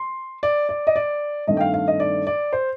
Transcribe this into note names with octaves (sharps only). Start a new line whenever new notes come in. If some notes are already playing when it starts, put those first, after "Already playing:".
Already playing: C6
D5
D5
D#5
D5
G2 D#3 A3 C4 D#5
G5
F5
F5
D#5
D5
D5
C5